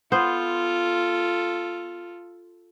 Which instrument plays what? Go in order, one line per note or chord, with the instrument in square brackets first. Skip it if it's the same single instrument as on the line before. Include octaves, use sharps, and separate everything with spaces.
[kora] B3 C5 [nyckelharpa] F4 A4